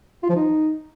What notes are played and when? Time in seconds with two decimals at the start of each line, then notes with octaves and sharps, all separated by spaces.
0.23 F4
0.29 F3
0.36 D#4